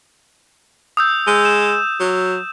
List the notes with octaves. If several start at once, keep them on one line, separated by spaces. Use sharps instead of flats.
D#6 E6 G6
G#3
E7
F#3